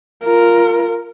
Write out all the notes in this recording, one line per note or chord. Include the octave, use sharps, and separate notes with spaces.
F4 A#4